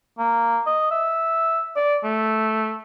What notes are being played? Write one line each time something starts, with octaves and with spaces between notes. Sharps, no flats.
A#3
D#5
E5
D5
A3